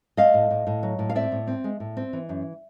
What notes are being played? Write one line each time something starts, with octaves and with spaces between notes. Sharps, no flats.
A3 D#5 F5
A2
A2
A2
F#3
A2
F5
C4 D5 E5
A2
C4
G#3
A2
C4
E3
F#2